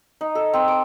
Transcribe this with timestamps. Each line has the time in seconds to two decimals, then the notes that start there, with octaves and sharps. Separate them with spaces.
0.21 D#4
0.35 A4
0.53 C4
0.68 D6